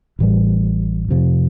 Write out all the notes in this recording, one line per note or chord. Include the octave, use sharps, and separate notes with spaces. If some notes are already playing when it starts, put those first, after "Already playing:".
A1 A2 E3 G3
F2 C3 F3